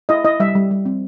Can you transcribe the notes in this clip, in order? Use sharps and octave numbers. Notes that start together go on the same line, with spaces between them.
E4 D#5
E4 D#5
G3 E5
G3
G3
C4